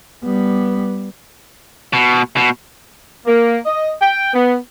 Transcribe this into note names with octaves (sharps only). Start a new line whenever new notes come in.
G3 B3
B2
B2
A#3
D#5
G5
B3